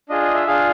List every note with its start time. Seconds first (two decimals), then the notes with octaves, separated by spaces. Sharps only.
0.09 D4 F4 G#4 D#5
0.22 D#5
0.34 E5
0.47 D4 F4 G#4 F5